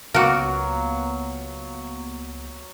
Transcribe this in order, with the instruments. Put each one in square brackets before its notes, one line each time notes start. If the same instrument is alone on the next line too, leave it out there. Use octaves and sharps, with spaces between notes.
[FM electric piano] C#2 A#3 B3 [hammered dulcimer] F#3 [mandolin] F4 D6 [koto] F#4 A#4